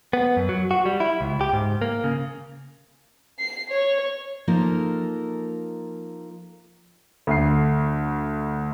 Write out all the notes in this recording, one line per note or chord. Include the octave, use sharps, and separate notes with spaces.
B3
F#2
F#3
F#4
G3
E4
C#2
G4
G#2
A#3
C#3
C7
C#5
F3 A#3 D#4 A4 A#4
D2 C7